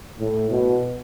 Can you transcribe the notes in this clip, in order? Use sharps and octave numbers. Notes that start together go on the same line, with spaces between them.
A2
B2